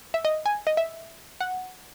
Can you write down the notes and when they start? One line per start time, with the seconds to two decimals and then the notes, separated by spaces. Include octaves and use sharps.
0.14 E5
0.25 D#5
0.46 G#5
0.67 D#5
0.77 E5
1.41 F#5